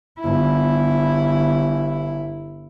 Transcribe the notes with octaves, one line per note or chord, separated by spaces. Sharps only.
G1 E4